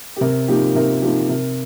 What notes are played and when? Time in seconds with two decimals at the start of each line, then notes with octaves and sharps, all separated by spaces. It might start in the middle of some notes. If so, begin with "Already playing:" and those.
0.16 G4
0.21 C3 A#4
0.48 F3 A#3 D#4 G4
0.75 C3 A#4
1.02 F3 A#3 D#4 G4
1.29 C3 A#4